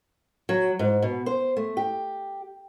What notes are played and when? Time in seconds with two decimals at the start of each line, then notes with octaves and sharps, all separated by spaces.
0.49 F#3
0.79 G#2
1.02 B2
1.26 C5
1.57 A3
1.77 G4